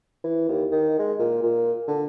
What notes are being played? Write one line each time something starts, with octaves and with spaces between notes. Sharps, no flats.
E3
D#2
D#3
G#3
A#2
A#2
D3